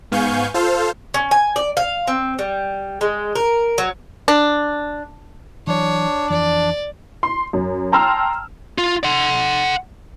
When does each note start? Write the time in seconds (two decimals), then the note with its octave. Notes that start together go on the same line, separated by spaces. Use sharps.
0.12 G#2 B3 F5 G#5 C#6 G6
0.54 F4 A4 C5 F5
1.14 C#4
1.31 G#5
1.56 D5
1.77 F5
2.07 C4
2.39 G3
3.01 G#3
3.35 A#4
3.78 F#3
4.28 D4
5.67 E3 F#3 D4 C#5
6.30 F2 E3 F3 D5
7.23 C6
7.53 F#2
7.92 G5 A5 A#5 C6 E6 F6
8.78 F4
9.04 F#5 C6